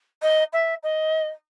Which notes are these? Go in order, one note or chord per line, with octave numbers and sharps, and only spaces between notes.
D#5
E5
D#5